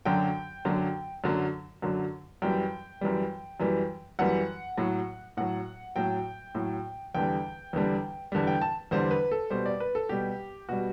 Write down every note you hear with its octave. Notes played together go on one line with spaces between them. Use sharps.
F#2 D3 F#3 G5
F#2 D3 F#3
F#2 D3 F#3
F#2 D3 F#3
F#2 E3 G3 G5
F#2 E3 G3
F#2 E3 G3
F#2 E3 G3 F#5
A2 F#3
A2 F#3 F#5
A2 F#3 G5
A2 F#3
E2 D3 G3 G5
E2 D3 G3
E2 D3 G3
G5
A5
E2 D3 G3 C5
B4
A4
B2 G3 C5
D5
B4
A4
B2 G3 G4
B2 G3 F#4